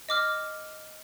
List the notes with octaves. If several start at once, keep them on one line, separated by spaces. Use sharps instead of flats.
D#5 D6 F6